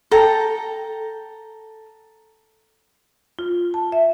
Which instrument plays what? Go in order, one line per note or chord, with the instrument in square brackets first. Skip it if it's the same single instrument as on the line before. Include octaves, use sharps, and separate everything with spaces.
[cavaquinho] A4 G5 A#5
[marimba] F4
A5
E5